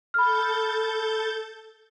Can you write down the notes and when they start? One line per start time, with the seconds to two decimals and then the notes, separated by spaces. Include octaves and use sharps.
0.14 A4 B5 F6 G6 A6